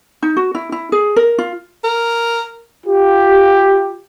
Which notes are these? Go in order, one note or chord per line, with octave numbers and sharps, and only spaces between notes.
D#4
F#4
E4
E4
G#4
A#4
F4
A#4
F4 G4